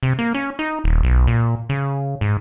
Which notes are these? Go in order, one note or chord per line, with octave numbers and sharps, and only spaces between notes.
C3
A#3
C#4
D#4
D#1
B1
A#2
C#3
G#2